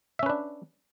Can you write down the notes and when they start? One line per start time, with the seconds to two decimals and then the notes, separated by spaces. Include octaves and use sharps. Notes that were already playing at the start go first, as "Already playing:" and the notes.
0.19 E5
0.23 C#4
0.26 B4
0.30 D4